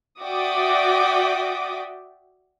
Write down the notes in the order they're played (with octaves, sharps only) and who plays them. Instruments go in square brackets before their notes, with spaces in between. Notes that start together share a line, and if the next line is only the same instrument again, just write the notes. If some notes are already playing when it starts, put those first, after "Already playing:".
[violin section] F#4 D5 E5 G5 D6 D#6